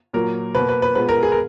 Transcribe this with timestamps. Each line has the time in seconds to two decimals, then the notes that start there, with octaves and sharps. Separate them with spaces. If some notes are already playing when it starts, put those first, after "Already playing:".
0.13 A#2 F#3 A#3 A#4
0.55 B2 A#3 B4
0.69 B4
0.82 B4
0.95 A#2 G#3 B3 B4
1.09 A#4
1.23 G#4
1.32 A#4